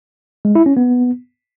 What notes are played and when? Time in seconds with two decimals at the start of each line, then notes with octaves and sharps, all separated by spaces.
0.45 G#3
0.55 E4
0.66 C#4
0.77 B3